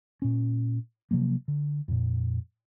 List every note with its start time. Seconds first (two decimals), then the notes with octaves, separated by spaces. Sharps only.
0.22 A#2 C#4
1.11 C3 F3 F#3 A#3
1.48 D3
1.88 F2 A#2